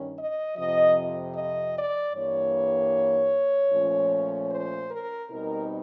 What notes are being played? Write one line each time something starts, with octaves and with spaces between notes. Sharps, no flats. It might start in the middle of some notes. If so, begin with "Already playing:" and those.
Already playing: G2 D#3 C#4
D#5
F2 C3 F3 D#5
D#5
D5
G2 E3 G3 A#3 C#5
A#2 F3 A3 C#4
C5
A#4
B2 G3 C4 D#4 A#4